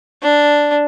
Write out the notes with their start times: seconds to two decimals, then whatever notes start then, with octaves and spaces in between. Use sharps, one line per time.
0.22 D4